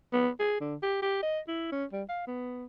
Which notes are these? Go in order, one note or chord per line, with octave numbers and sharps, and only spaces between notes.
B3
G#4
D3
G4
G4
D#5
E4
C#4
G3
F5
B3